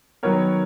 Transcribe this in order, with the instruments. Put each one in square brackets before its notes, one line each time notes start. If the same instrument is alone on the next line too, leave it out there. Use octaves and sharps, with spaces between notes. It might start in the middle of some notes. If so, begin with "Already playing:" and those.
[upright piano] D#3 F#3 B3 A#4 C#5